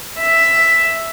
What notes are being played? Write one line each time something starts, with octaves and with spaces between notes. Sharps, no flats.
E5